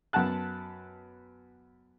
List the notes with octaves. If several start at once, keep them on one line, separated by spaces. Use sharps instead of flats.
F#2 B3 F#5 A5 F#6